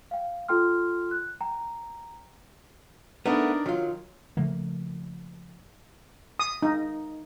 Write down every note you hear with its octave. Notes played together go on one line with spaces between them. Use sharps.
F5 G5
F4 A4 G5 C6 F6
F#6
G5 A#5
A3 B3 D4 D#4 A#4
D#3 F#3 F4
C#3 F3 A3 A#3
D#6
D#4